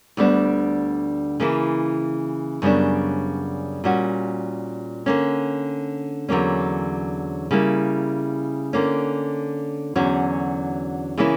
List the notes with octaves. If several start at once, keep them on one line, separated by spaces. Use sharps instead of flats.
D2 D3 G3 B3 D4
C#3 E3 A#3 E4
F#2 C#3 G3 B3 D4
A#2 G3 C#4 F#4
D3 A#3 C#4
E2 D3 F#3 A#3 C#4
C#3 G3 A#3 E4
D3 A#3 C#4
E2 D3 F#3 C#4 F#4
C#3 E3 A#3 C#4 E4